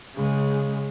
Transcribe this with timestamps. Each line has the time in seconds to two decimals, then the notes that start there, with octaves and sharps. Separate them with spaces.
0.15 C#3 G#3